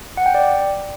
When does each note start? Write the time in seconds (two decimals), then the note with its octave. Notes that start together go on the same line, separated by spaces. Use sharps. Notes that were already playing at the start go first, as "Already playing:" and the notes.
0.17 F#5
0.26 G5
0.34 D5